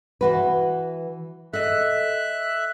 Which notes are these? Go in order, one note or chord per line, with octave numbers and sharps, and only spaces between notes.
E3 F#4 B4
A4 D#5 E5 F#6